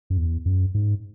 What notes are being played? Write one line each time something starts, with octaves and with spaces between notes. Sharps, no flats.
F#2
E2
F#2
G#2